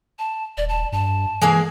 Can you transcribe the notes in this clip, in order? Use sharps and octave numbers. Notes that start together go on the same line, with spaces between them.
A5
D#1 D5
A5
G2 A5
E3 G#3 A#3 G#4